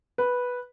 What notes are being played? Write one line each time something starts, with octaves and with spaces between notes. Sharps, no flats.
B4